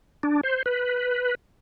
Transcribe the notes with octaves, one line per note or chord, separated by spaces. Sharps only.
D4
C5
B4